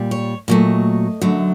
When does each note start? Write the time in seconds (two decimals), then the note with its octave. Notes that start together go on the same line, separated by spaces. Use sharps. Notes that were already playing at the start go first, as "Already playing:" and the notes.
Already playing: A#2 G3
0.11 C#5
0.48 A#2 F#3 A3 D#5
1.21 F#2 D3 F#3 A3